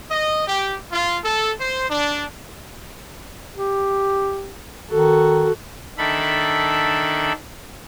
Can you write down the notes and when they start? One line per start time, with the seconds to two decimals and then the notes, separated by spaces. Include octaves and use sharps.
0.10 D#5
0.47 G4
0.92 F4
1.24 A4
1.59 C5
1.89 D4
3.56 G4
4.90 D#3 F#4 A4
5.98 D#3 D4 A4 E5 B5